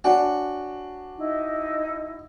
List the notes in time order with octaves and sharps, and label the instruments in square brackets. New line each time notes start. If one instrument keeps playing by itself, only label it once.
[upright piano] D4 [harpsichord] F#4 [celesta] C#5 F#5 G#5
[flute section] D#4 E4